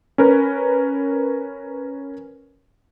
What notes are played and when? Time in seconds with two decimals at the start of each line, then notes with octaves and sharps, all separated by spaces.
0.18 C#4 A#4 B4